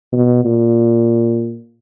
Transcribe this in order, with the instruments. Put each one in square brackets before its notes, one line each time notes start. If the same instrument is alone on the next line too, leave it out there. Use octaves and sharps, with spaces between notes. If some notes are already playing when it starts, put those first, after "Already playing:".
[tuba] B2
A#2